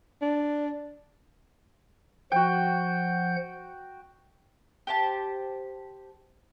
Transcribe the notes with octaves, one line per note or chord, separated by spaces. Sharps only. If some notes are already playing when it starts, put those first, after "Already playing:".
D4
F3 F#4 F#5 G5 G6
G4 C5 A5